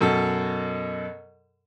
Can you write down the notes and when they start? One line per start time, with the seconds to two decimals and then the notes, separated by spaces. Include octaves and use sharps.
0.01 F#2 B2 A4